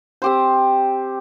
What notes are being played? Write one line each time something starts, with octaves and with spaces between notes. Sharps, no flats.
C4 G4 C5